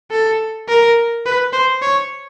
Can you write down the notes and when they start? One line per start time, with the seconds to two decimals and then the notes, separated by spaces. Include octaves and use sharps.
0.11 A4
0.69 A#4
1.26 B4
1.53 C5
1.82 C#5